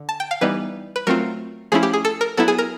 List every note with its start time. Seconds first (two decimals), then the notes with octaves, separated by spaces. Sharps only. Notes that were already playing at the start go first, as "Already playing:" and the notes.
Already playing: D3
0.09 A5
0.20 G5
0.31 F5
0.41 E3 G3 B3 D#4 B4
0.96 B4
1.07 F#3 A3 C4 F4 A#4
1.72 F3 A3 C#4 E4 G#4
1.83 G4
1.93 G#4
2.05 A4
2.21 A#4
2.37 F#3 B3 E4 A4
2.48 G#4
2.58 A#4